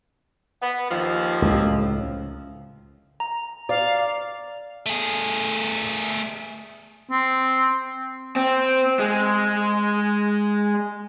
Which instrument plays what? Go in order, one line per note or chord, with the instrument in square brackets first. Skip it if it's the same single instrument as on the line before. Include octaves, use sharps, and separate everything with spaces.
[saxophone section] B3
D#2 F3
[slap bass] C#2 A2
[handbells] A#5
[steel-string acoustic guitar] D5 [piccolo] F5
[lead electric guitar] A3 G#4
[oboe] C4
[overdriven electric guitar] C4
G#3